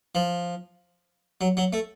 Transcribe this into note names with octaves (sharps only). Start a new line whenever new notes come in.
F3
F#3
F#3
A3